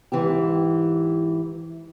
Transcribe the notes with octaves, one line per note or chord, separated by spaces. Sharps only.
G#2 E3 E4 G4